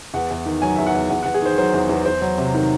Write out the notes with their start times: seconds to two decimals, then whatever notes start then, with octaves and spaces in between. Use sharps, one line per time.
0.14 E2 F#5
0.31 E2
0.46 D#3
0.62 F#3 G#5
0.76 E2 E5
0.87 F#5
0.94 E2
1.10 E2 F#5
1.23 E2 F#5
1.34 G#4
1.42 D#3 C5
1.58 F#3 C5
1.74 E2
1.89 E2
2.06 E2 C5
2.22 F#3
2.38 C3
2.54 D#3